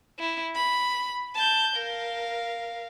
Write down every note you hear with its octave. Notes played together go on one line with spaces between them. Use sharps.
E4
B5
A5 G6
A#4 F5